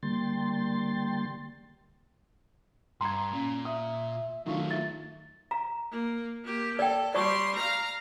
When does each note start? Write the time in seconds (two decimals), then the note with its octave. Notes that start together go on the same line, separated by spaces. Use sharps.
0.03 D3 G3 A#3 G5 C6 A6
3.01 G2 A#5 C6 G#6
3.33 A#2 C#4
3.65 E5 D#6
4.46 D#3 F#3 A3 D4 F4 C#6
4.71 E5 A6
5.51 A#5
5.91 A#3
6.44 A#3 G4
6.79 A4 D5 G5
7.15 G3 D5 A5 C6 C#6
7.56 F5 A#5